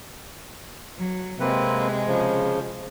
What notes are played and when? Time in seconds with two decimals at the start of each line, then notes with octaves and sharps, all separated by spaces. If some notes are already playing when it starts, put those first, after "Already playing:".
0.98 F#3
1.40 C3 G#3 A#3 C4 B4
2.07 C#3 F3